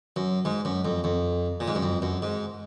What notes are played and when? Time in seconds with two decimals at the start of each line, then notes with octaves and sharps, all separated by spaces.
0.16 F#2
0.45 G#2
0.65 F#2
0.85 F2
1.04 F2
1.60 A#2
1.68 G#2
1.75 F#2
1.82 F2
2.02 F#2
2.22 G#2